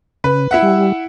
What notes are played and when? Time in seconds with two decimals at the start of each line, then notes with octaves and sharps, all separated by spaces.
0.24 C#3 B4
0.51 E4 E5 F#5
0.63 G3